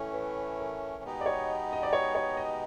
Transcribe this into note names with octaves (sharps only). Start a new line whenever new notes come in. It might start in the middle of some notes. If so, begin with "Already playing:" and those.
Already playing: A2 E3 A3 C#4
B4
A#4
B2 G#3 B3 D#4 G4
D5
C#5
D#5
D5
C#5
C#5
D#5